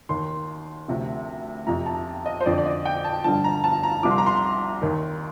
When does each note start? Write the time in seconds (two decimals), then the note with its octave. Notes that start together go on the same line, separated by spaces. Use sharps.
0.09 D#2 D#3 C6
0.88 D2 C3 F3
1.67 F2 C3 F3 A#5
1.86 A5
2.26 D#5
2.41 C5
2.46 F2 D3 F3 D5
2.58 D5
2.66 D#5
2.85 G5
3.04 A5
3.24 G2 D3 F3 A5
3.44 A#5
3.64 A5
3.83 A#5
4.03 C2 C3 F3 D6
4.11 C6
4.18 A#5
4.26 C6
4.82 D#2 D#3